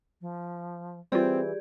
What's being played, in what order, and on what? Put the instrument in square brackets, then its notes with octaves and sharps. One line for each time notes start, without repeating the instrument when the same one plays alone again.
[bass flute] F3
[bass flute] E3 [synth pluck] G3 F4 [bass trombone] C4 [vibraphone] G4 G#4 D5